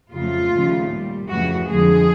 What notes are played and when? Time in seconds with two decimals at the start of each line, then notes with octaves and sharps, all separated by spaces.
0.11 F2 C#3 F#3 A3 F4
0.51 D#2 C#3 F3 A3
0.89 A#2
0.94 G3
1.28 F2 C#3 E3 A3 F#4
1.67 F2 D3 F3 G#3 G#4